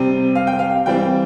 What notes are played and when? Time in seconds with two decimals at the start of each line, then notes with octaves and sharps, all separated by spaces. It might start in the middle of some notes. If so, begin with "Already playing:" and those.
Already playing: C3 G3 C4
0.36 F5
0.47 G5
0.59 F5
0.86 E3 G3 C4 G5